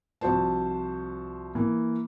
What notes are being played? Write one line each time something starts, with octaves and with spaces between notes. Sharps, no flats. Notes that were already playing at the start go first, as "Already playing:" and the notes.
C2 F3 F#4 C5 A5
E3 A#3